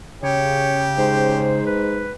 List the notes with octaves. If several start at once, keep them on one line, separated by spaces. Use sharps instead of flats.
C#3 G4 C#5
G#2 C5
B4